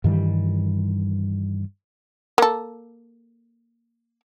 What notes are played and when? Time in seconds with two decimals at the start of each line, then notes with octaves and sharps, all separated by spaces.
0.04 G2 D#3 E3 G3
2.38 A#3 A4